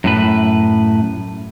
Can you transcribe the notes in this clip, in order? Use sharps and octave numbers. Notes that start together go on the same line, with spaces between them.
F#2 A2 B4